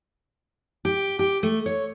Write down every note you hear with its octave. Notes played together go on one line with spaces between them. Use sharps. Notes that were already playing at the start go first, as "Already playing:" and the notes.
G4
G4
A3
C#5